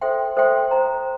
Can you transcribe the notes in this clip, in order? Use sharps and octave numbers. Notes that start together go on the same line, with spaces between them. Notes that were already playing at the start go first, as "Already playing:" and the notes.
A4 C5 E5 G5 C6
A4 C5 E5 G5 C6
C5 G5 A#5